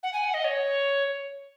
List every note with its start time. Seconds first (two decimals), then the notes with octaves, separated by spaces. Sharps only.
0.03 F#5
0.13 G#5
0.24 F#5
0.34 D#5
0.45 C#5